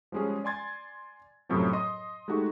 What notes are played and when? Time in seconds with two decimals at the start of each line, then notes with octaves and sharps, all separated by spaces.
0.12 F3 G3 G#3 C#4 G#4
0.44 D5 G#5 C6 G#6 A6
1.49 F#2 A2 C3 F3 F#3
1.73 D#5 C6 D#6
2.28 G#3 A3 D#4 F#4 G4